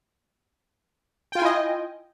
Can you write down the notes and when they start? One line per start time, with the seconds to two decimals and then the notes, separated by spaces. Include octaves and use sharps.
1.32 G5
1.35 F4
1.39 G#5
1.42 E4
1.45 D#5